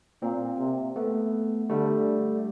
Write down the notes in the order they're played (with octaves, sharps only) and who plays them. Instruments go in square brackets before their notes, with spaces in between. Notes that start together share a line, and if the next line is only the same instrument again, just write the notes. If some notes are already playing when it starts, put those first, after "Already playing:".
[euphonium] A#2 [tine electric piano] A#3 C4
[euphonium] C3
[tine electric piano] A3 B3
[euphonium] D3 [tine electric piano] G3 A3